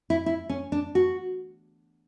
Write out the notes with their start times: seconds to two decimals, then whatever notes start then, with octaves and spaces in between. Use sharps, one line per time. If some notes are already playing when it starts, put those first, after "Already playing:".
0.10 E4
0.26 E4
0.49 C#4
0.72 D4
0.95 F#4